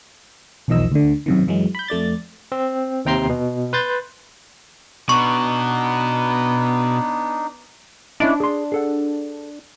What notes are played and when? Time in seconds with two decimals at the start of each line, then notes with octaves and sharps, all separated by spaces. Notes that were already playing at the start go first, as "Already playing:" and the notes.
0.68 B1 E2 D#3 F3 D#5 E6
0.92 D2 D3
1.26 F#2 C3 D#3
1.47 F#2 E3 F#3 G#3
1.75 B5 G6
1.88 F2 A3 D5 A6
2.52 C4
3.05 D#2 C3 G5 A#5 C6 C7
3.29 B2
3.73 B4 C6 G6 A6
5.09 B2 B3 D4 D#4 C#6
8.20 C#4 D4 E4 D#5
8.40 G#4 C6
8.72 G#4 A4 F#5